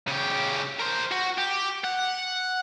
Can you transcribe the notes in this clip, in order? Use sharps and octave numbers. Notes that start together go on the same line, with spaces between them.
C#3 G4
A#4 C5
F#4
G4
F#5